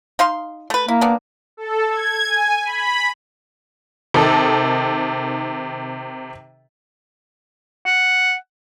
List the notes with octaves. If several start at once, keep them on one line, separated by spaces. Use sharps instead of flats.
D#4 F5 C6
A3 B4
A#3 E4
B3 D4
A4
G#6
G#5
B5
C3 D#3 D#4 A4
F#5